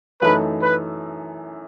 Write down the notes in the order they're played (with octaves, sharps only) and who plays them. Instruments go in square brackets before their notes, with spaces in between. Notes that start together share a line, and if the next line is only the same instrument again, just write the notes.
[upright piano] F#2 E3 A3 D#4 A4 [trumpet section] B4
[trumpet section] B4